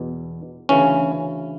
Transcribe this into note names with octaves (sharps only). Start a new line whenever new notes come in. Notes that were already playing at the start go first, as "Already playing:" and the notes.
Already playing: E2 B2
D2 C#3 E3 C#4